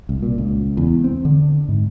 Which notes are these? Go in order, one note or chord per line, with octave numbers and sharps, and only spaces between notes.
C2
A#2
C#2
E2
C4
D3
G#2